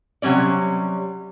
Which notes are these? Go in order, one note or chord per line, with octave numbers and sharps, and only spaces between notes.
C3 F#3 G3 C#4 D5